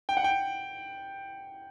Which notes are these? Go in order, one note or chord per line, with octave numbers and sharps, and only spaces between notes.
G5
F#5
G5